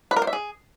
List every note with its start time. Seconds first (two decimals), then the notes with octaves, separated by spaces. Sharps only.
0.11 B4
0.16 A#4
0.22 C5
0.27 E5
0.33 G#4